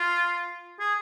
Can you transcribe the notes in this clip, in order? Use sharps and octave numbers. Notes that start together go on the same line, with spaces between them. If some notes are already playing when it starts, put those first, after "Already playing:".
Already playing: F4
G#4